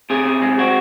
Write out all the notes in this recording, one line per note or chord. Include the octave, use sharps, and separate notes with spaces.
C3 G#4
C3
G#3
C4 F#4